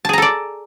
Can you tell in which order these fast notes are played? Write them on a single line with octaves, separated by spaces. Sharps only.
A5 G#4 A#5 A4 D5